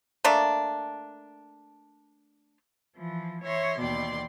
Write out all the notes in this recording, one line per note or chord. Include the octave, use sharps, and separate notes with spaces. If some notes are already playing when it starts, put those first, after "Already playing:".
A3 A#3 D4
E3 F3
E3 C#5 E5 C6 A#6
D#2 B2 E3 D5 G5 C6